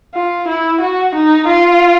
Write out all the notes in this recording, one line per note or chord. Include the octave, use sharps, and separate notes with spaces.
F4
E4
F#4
D#4
F4